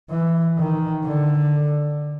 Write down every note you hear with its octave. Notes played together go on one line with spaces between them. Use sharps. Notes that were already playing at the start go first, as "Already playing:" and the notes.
E3
D#3
D3